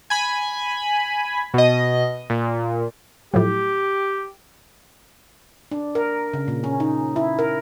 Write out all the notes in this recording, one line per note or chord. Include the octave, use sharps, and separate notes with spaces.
G#5 B5
B2 D#5
A#2
A2 F3 F#3 G4
D4
A#4
C#3
A#2
C#4
D#4
E4
A#4